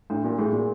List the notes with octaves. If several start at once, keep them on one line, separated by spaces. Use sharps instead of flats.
A2 D4
A#2
A2 G#4
A#2